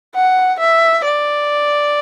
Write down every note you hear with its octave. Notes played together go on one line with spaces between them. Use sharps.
F#5
E5
D5